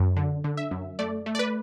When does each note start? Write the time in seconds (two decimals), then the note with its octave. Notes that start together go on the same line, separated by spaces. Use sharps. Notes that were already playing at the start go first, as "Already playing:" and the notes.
Already playing: F#2
0.17 D3
0.44 D3
0.57 E5
0.71 F#2
0.99 A3 D5
1.26 A3
1.35 D5
1.39 B4